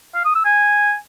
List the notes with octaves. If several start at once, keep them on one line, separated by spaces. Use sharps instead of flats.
F5
D#6
E6
G#5